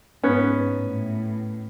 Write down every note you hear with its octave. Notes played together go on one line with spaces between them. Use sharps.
G#2 B3 C#4
A2